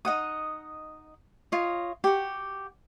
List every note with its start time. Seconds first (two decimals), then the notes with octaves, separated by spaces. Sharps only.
0.05 D#4 D#5 F#5 D#6
1.52 F4 C#5 D#5
2.04 F#4 G4